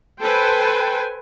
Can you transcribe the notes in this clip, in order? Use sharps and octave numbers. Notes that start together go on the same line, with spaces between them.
A4 B4 C5 G5 G#5